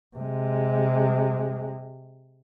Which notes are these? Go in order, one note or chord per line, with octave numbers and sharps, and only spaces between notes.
C3 G#3